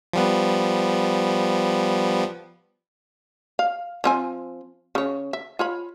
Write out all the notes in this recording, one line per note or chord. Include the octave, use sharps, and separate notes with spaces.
F3 G3 B3
F5
F3 C4 G#5
C#3 C#5
E5
F4 C#5 B5